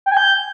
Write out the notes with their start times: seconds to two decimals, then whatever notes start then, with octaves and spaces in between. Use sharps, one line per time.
0.06 G5
0.11 G#5
0.17 G6